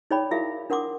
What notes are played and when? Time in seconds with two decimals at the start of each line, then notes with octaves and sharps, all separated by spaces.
0.11 D#4 G#4 C#5 D5 G5 B5
0.31 E4 F#4 G#4 A#4 E5 F5
0.70 D4 A#4 F#5 C6 D6 D#6